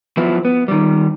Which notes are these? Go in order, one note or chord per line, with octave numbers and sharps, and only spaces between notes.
F3 F#3 B3 E4
B3
D#3 G3